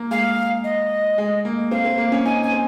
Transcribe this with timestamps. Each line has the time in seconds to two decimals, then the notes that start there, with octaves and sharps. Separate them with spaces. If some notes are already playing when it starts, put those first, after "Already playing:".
Already playing: A#3
0.11 G#3 F5
0.64 D#5
1.18 G#3
1.45 A#3
1.71 C4 F5
1.85 C4
1.98 A#3
2.12 C#4
2.25 D#4 G#5
2.43 G#5
2.52 C4